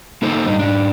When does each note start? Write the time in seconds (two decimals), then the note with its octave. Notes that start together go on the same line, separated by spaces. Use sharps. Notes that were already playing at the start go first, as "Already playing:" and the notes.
0.22 A#3 D#4 A4 C5
0.46 G2 D#4
0.59 G#2 D4